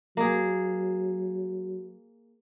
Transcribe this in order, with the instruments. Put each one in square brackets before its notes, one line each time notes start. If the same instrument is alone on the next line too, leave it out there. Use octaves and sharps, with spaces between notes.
[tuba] F#3 [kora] A#3 G#4